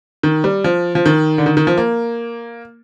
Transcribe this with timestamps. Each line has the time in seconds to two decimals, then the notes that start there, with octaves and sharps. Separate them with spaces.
0.23 D#3
0.44 G3
0.64 F3
0.95 F3
1.06 D#3
1.38 D3
1.46 D#3
1.57 D#3
1.67 F3
1.78 A#3